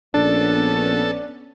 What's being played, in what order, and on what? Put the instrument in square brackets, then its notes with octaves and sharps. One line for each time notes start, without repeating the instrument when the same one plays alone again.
[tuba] A#1 [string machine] B3 C#4 [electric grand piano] D4 [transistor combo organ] A4